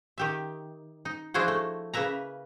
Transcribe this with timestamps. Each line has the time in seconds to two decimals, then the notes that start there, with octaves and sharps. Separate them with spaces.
0.18 D#3 G4 E5
1.05 D#4
1.34 F3 D4 E4 F#4 G#4 C5
1.48 A3
1.94 C#3 A#3 B4 E5 A#5